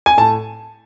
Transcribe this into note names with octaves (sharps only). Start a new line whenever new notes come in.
G#5
A2 A5